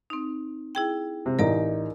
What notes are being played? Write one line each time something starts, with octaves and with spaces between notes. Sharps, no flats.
C4 D#4
E4 G#4 G5
C3
A1 D#4 A#4 D5 A#5